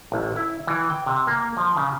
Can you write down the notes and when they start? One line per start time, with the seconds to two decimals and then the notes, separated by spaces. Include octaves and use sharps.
0.12 A1
0.36 E4
0.67 E3
0.90 G5
1.06 C3
1.27 A#3
1.57 F3
1.77 C#3